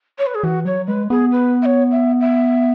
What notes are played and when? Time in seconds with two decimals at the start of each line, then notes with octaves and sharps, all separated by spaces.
0.18 C#5
0.27 B4
0.35 G#4
0.43 E3 F#4
0.65 F#3 C#5
0.88 G#3 B4
1.10 B3 G#4
1.32 B4
1.62 E5
1.66 C#5
1.92 E5
2.21 E5